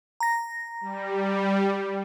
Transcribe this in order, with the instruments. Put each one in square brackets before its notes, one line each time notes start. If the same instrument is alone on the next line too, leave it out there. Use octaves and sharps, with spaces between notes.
[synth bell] A#5 A#6
[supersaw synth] G3